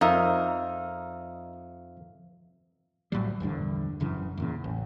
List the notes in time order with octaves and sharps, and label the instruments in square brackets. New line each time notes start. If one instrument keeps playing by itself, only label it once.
[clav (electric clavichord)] F2 [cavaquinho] D#4 A#4 [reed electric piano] E5 F5 E6
[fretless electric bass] A#1 A2 F#3 G3
A#1 E2 G2 D3
F#1 F#2 C#3 E3
E2 A#2 C#3
A1